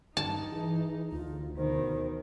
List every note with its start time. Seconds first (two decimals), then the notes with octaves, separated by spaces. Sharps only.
0.17 G2 D#4 A5
0.52 E3 G#4
1.12 D2 F4
1.56 B2 D#3 C5